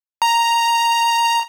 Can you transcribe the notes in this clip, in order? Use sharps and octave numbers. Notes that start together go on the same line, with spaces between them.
A#5